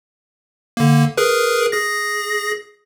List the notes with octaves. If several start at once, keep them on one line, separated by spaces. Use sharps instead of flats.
D3 A#3
G#4 A#4 B4
G#4 A#6